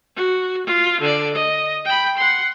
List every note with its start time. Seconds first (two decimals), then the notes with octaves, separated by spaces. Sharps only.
0.16 F#4
0.67 F4
1.01 D3 D5
1.34 D#5
1.85 G5 B5
2.17 F#5 C6